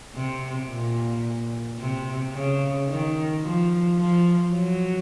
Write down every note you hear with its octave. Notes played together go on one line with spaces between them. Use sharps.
C3
A#2
C3
C#3
D#3
F3
F3
F#3